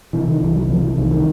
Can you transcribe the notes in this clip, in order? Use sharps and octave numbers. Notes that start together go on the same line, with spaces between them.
C3 E3
D#3
C2 E3
F#3
C3 F3
E3
C2 D#3
D#3